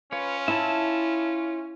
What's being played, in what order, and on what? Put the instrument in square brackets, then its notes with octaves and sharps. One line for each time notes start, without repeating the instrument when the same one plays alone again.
[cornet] C#4 [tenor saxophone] F4 [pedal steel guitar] B4 C#5
[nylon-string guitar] E4 [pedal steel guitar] E5 A5